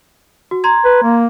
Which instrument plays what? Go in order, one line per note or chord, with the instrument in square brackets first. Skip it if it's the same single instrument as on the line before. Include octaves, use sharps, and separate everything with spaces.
[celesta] F#4
A#5 C6 G#6
[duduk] B4
A#3